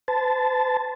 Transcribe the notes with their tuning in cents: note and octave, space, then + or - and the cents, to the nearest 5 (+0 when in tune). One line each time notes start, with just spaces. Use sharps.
C5 -45 A5 -10